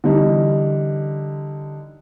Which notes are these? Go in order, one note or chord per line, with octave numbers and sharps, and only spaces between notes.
D3 E3 G3 D#4